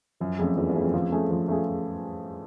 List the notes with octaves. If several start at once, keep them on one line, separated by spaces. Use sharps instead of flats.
F#2 F3
F2 A3 C#4 F4 G#4
E2 F3
E2
A3 C#4 F4 G#4
F2
F2 F3
A3 C#4 F4 G#4
F3
A3 C#4 F4 G#4